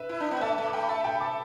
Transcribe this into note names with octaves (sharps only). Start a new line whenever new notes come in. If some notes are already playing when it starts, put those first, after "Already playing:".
Already playing: B4 E5
E4
D4
B3
A3 E5 A5
A3
D6
A3 G5 B5
E5 A5
G5 B5
A5 D6